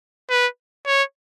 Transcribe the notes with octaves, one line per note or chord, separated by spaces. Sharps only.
B4
C#5